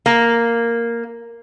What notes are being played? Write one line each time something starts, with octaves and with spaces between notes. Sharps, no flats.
A#3